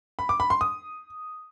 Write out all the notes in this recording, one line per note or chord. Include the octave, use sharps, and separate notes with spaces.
B5
D6
B5
C6
D#6